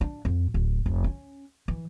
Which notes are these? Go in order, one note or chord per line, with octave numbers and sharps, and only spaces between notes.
D4
F2
D1
F1
C#4
E3